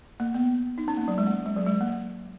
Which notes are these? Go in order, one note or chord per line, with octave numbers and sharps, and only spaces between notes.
A#3
B3
D#4
C#4
A#3
F#3
G#3
A#3
G#3
F#3
G#3
A#3